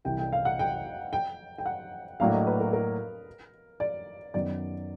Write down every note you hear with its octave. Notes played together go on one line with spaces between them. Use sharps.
C2 C3 E3 G3 G5
G5
F5
F#5
G5
G5
G5
F#5
A2 F#3 A#3 D4 F5
D#5
B4
A#4
A#4
D5
F#2 D#3 F#3 B3 D5